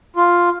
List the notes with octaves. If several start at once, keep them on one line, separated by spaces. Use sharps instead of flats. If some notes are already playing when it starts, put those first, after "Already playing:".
F4